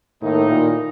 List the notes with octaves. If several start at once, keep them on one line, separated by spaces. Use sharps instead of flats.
A2 D#3 A#3 D#4
A#2